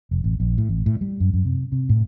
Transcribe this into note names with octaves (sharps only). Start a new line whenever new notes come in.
F1
A1
A#1
A2
A1
A2
G3
F#2
F#2
C3
C3
A2